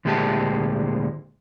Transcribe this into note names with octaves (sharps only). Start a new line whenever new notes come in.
D2 A#2 G#3 G4 D#5 A5